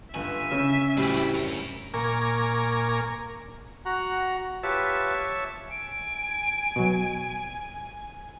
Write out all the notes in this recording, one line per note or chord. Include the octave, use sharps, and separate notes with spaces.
C#2 G2 D3 E5 G#5
C#3 C#4
D2 A2 G3 D4 E4
C#4 A#4
A#2 A#4 G#5 A#5 C#6 D6
F#4 F#5 A#5
F4 G4 B4 C#5 E5 A5
G#5 D7
B2 F#3